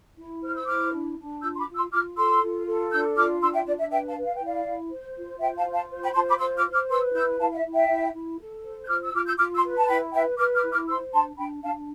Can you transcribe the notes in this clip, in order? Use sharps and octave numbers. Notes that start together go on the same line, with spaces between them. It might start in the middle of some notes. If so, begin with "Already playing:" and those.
E4
C5 F6
E6
E4 D6 F6
D4
D4
F4 E6 G6
C6
B5 D6
F4
C6 E6
F4 D6 F6
A4 C6 E6
F4
A4
D4 E6 G6
F4 D6 F6
D4 C6 E6
E5 G5
D4 D5
E5
B4 E5 G5
F5 A5
B4
F5
G5
E4 D5 F5
E4
C5
F4
C5 E5 G5
F5 A5
F4
F5 A5
C5
G5 B5
F4 A5 C6
B5 D6
C5 C6 E6
D6 F6
C5
D6 F6
B4 C6 E6
E4 E6 G6
E4 F5 A5
F5
E5
E4
E5 G5
E4
E4
A4
C5
G6
F4 D6 F6
E6
F4 D6 F6
E6 G6
F4 D6 F6
C6 E6
B4
A5
E4 G5 B5
B4 E5 G5
B4 D6 F6
D6 F6
E4
D6 F6
C5 C6 E6
D4 A5 C6
D4 G5 B5
D4 F5 A5